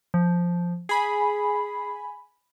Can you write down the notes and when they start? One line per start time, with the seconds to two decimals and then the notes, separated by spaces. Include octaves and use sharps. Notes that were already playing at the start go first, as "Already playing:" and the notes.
0.14 F3
0.89 G#4 G#5 B5